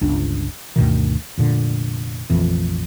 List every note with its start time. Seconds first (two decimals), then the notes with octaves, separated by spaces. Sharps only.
0.01 G1 C#2 D4
0.76 D2 G2 B2 D#3
1.37 F1 A#2 D3
2.30 F1 A#1 F2 E3